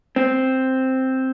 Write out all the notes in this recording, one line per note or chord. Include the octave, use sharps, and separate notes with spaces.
C4